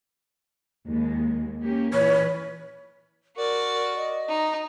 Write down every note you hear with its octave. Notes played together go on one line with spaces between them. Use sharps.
D#2 G#3
A#3 C#4 G4
A#2 E3 B4 C#5
F#4 A#4 D5
D#5
D#4